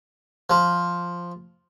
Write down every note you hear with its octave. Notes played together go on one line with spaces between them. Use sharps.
F3